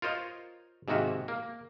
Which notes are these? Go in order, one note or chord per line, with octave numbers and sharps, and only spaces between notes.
F4 A#4 C5 C#5 D#5
G#2 C3 D#3 A#3 F#4 E5
A#3